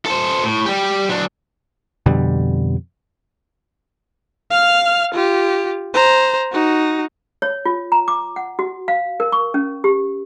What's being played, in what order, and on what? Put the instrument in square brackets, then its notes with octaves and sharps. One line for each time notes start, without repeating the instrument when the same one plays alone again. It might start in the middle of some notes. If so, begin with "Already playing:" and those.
[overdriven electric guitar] A4 C5
A2
G3 G4
F#3 D4
[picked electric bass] F2 B2 D3 G3
[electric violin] F5 F6
F4 G4
C5 A#5
D#4 F#4
[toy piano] C#5
F4
A#5
D6
F#5
F#4
F5
A#4
C#6
C#4
G4